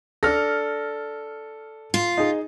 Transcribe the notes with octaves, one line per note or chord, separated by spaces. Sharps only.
D4 A4 F6 A#6
F4
D#4 G#4